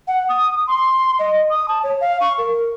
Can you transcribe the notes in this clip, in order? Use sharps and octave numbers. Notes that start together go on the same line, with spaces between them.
F#5
D#6
C6
D#5
D#6
A5
C#5
F5
C#6
A#4